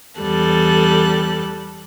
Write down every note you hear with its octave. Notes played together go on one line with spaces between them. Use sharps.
E2 G3 A4 F#6